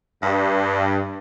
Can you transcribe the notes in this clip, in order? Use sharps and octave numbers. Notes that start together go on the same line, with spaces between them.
G2